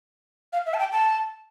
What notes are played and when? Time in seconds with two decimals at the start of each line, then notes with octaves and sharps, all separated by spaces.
0.53 F5
0.66 E5
0.74 A5
0.79 G5
0.92 A5